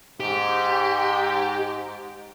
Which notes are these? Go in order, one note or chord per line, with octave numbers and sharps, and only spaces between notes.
G#2 G4